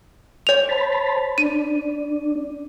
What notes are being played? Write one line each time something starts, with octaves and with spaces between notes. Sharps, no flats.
C#5 F7
C5 A5 B5
D4 D#7